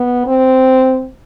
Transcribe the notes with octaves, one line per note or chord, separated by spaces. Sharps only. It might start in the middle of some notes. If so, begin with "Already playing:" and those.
Already playing: B3
C4